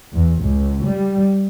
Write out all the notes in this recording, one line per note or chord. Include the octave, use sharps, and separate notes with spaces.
E2
C#2
G3